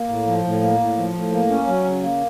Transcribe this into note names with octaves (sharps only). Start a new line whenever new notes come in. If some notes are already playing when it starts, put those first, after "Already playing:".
Already playing: A#3
A2
F3
A2
A#3
A2
F3
A2
A#3
C#4
F#3
C#3
A#3